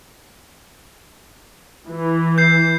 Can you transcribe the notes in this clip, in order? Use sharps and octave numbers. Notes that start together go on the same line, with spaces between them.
E3
G6 C7